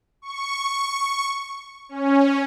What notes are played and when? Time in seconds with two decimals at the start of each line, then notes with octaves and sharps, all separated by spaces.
0.22 C#6
1.89 C#4